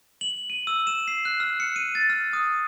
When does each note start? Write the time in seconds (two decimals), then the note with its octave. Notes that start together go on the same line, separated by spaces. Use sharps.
0.21 F#7
0.50 D#7
0.67 E6
0.87 E7
1.08 C7
1.25 F#6
1.40 F6
1.60 C#7
1.76 D#7
1.95 A6
2.10 F6
2.33 D#6